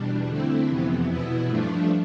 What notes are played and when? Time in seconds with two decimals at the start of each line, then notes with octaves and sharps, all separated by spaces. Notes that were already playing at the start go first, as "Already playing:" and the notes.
Already playing: E2 B2 G3 D4
0.29 D3 A3 C4 E4
0.68 F2 C3 E3 B3
1.08 E2 B2 B3 E4
1.48 G2 F3 A3 D4